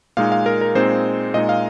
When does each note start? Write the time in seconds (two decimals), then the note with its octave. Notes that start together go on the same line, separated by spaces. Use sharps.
0.17 A#2 G#3 D#4 F5
0.32 F5
0.46 A#4
0.61 A#4
0.75 A#2 G#3 C4 D#4 C5
1.34 A#2 G#3 D#4 D#5
1.49 F5